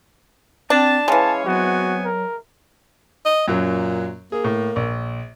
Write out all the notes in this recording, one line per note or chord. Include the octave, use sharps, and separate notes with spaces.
C4 D4 A5
E3 G#3 C#4 C#5 F5 A5
F#3 B3 C4 F#4 G#5
A#4
D#5
F#2 A#2 F#3
A#3 G#4
A2
A#1